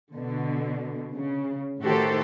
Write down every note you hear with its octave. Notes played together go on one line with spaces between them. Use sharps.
B2 D3
C#3
A2 D#3 F#4 G4 A4 C5